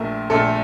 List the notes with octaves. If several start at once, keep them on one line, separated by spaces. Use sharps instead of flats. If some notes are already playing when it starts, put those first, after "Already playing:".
Already playing: A#1 A#2 A3 A#4
A#1 A#2 A3 A4